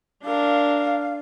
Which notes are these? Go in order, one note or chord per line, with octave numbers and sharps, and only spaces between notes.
D4 A#4 F5